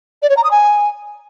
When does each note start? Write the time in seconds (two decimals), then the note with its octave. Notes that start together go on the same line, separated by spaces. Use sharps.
0.22 D5
0.30 C#5
0.37 A#5
0.44 D#6
0.51 G#5